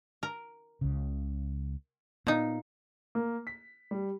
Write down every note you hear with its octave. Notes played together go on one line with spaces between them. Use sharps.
A#4
C#2 C#3
A#2 B3 D#4
A#3
B6
G3